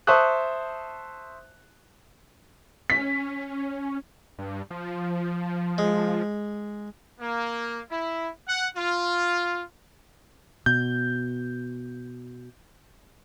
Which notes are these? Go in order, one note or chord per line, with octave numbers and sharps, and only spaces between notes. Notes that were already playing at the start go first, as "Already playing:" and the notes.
C5 E5 A5 C#6 D#6 F#6
C#4 B6
G2
F3
G#3
A#3
E4
F#5
F4
B2 G6